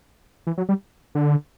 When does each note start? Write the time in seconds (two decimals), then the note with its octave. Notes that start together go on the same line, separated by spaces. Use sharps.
0.47 E3
0.58 F#3
0.69 G3
1.15 D3